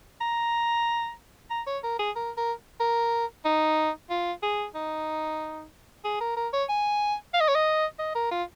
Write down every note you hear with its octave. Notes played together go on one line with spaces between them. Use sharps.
A#5
A#5
C#5
A#4
G#4
A#4
A#4
A#4
D#4
F4
G#4
D#4
G#4
A#4
A#4
C#5
G#5
F5
D#5
C#5
D#5
D#5
A#4
F4